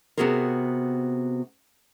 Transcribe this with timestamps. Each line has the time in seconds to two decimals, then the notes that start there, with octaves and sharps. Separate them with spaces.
0.17 C3 F3 B3 F#4 G#4 A#4